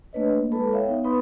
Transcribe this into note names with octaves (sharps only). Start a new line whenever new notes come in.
A3 A#3 D4 B4 C#5 D#5
A#3
G#3 E4 A4 B4 A5 B5
C#5 E5 F5 G5
B3 D#4
B3 D#4 B4 B5 C6 D#6